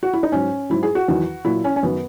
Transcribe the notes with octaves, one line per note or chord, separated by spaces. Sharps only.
F#4
E4
D#4
G#2 F#3 C#4
G#2 F#3 E4
G#4
F#4
E2 D#3 F#3
A#2 F#3 E4
C#4
C#4
F#2 D#3 F#3 B3